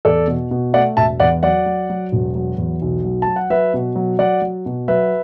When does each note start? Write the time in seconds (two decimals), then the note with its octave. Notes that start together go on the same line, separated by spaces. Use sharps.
0.05 E2 A4 D5
0.27 B2
0.51 B2
0.74 A3 D5 F#5
0.97 E1 E5 A5
1.20 E2 D5 F#5
1.43 F#3 D5 F#5
1.66 F#3
1.90 F#3
2.12 E1
2.35 F#3
2.58 E2
2.82 B1
3.04 F#3
3.22 F#3 A5
3.36 F#5
3.50 F#3 B4 E5
3.74 B2
3.96 F#3
4.19 F#3 D5 F#5
4.42 F#3
4.66 B2
4.88 F#3 B4 E5